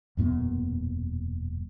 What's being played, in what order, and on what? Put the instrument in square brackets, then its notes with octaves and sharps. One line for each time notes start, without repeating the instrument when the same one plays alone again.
[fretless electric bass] E1 F#2 A#2 B3